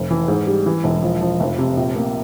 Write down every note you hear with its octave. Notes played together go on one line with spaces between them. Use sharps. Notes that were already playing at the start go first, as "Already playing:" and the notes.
Already playing: F1
E3
G#2
G3
E3
E1
F3
F3
F1
C3
A#1
A#3